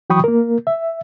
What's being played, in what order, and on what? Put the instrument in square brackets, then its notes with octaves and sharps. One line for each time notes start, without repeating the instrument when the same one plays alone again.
[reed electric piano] E3 F#3 G5 B5 C#6 D#6
A#3 A#4
E5